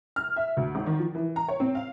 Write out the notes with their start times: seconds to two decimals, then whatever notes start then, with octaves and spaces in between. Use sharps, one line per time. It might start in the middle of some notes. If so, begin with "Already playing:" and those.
0.16 F6
0.36 E5
0.57 D2
0.75 G#1
0.86 D#3
1.00 F3
1.15 E3
1.36 A#5
1.48 C#5
1.60 C4
1.75 F5